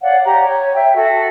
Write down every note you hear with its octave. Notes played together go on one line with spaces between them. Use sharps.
C#5 D5 F5 F#5
G4 C#5 A#5
C#5
E5 G5
F#4 A4 E5